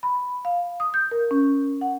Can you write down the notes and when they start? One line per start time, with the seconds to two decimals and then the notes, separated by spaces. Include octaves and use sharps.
0.03 B5
0.45 F5
0.80 D#6
0.94 G6
1.11 A#4
1.31 C#4
1.81 F#5